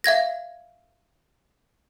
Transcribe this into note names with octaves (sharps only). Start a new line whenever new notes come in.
E5 F5 G#6 A#6